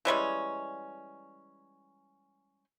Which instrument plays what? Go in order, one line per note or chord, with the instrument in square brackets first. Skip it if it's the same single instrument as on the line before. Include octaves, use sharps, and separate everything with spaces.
[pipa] E3 G3 G#3 C#4